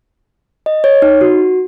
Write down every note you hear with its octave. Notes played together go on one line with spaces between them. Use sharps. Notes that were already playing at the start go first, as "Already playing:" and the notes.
D#5
C#5
D#4
F#4